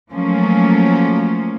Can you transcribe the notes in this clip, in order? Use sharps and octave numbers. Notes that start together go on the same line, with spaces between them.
F3 F#3 A3 A#3 C#4